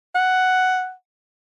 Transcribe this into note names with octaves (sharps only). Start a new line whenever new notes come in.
F#5